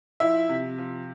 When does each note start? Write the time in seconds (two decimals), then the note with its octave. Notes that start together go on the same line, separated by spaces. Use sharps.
0.20 F3 E4 E5
0.49 C3
0.78 F3